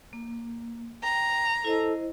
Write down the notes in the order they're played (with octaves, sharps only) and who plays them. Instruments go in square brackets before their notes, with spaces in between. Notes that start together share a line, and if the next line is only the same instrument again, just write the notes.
[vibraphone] A#3
[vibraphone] G5 [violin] A#5
[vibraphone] E4 C5 D#5 [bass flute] A4